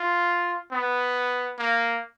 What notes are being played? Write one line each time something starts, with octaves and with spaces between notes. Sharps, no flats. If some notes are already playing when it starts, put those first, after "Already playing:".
Already playing: F4
B3
A#3